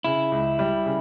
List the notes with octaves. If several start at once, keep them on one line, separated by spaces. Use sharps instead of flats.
C#3 E4
C#2
G3
C#3